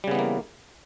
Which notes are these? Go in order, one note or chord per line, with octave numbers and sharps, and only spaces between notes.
C#3 E3 G3 A#3 B3